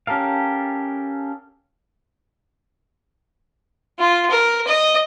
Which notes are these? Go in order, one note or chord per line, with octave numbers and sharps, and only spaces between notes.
C#4 G4 A4 A#4 F5
F4
A#4
D#5